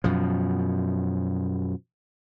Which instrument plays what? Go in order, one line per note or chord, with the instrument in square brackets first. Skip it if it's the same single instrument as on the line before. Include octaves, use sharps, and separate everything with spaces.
[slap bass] F#2 B2 F3